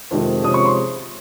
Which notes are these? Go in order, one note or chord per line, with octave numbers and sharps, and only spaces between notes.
F2 C3 D#3 G#3
C3 F3 G#3 C#4 D#6
C#6
C6